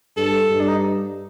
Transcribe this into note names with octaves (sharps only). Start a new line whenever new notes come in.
G2 A4
G2
D4
D#4